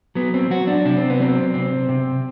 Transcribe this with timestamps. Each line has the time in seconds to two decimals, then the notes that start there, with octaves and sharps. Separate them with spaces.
0.15 F#3 B3
0.34 C4
0.50 F#3 F#4
0.67 D4
0.85 C3 D4
0.97 C4
1.10 B3
1.20 F#3 C4
1.54 C3 C4
1.89 C3